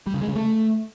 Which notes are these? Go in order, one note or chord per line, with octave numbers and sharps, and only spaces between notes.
G3
C#3
G#3
C#3
A3